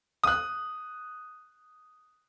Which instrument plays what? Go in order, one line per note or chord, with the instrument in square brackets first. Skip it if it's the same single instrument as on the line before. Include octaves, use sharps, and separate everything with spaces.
[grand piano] D#6 F#6